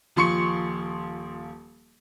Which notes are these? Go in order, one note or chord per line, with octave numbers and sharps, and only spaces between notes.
D#1 F3 C6 C#6 C#7